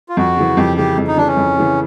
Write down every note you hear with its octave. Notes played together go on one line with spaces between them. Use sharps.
F4
F2 F#4
C#3 E3
F2 G4
C#3 E3 G4
F2
D#4
C#3 E3 D4
C#4
F2
C#3 E3